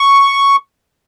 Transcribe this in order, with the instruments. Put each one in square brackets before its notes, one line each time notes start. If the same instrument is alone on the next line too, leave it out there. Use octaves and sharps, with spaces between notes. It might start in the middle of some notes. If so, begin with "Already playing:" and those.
Already playing: [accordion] C#6